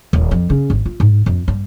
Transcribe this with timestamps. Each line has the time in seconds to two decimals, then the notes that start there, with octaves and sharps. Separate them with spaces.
0.13 D#1
0.31 F2
0.50 C#3
0.70 G#1
0.86 F4
1.00 G#2
1.26 F2
1.48 G2